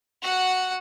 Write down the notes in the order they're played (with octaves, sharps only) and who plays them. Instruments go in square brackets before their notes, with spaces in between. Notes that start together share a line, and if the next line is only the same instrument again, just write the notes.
[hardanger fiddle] F#4 F#5